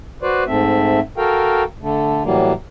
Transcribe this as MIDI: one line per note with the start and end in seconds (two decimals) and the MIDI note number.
0.23 0.44 66
0.23 0.44 71
0.23 0.44 72
0.23 0.44 74
0.47 1.00 44
0.47 1.00 57
0.47 1.00 60
0.47 1.00 76
1.18 1.63 66
1.18 1.63 69
1.18 1.63 70
1.18 1.63 77
1.18 1.63 79
1.81 2.23 50
1.81 2.23 57
2.24 2.53 45
2.24 2.53 52
2.24 2.53 54
2.24 2.53 55
2.24 2.53 58